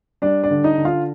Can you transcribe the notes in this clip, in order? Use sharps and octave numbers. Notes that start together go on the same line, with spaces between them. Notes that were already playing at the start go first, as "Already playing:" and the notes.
G3 D4 D5
D4 D5
D3
D#4 D#5
D3
F4 F5